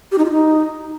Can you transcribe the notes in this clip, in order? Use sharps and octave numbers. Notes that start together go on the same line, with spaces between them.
G4
D#4
F4
D#4